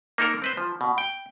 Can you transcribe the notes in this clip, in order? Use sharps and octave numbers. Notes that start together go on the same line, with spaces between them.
A#3 D#4 A4 A#4
C4 B4 C5
F3
B2
G5